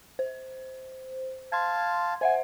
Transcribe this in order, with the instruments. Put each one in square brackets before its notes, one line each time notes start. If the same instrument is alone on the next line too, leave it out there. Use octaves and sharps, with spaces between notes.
[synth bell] C5
[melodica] F5 A5 [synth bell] C6 G#6
[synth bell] C5 E5 F#5 [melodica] G#5